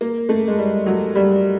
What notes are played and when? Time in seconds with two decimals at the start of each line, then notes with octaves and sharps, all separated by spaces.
0.01 A#3
0.29 A3
0.47 G#3
0.58 G3
0.86 F#3
1.15 G3